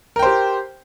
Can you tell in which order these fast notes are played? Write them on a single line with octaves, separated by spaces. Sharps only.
A#4 G5 C5 G4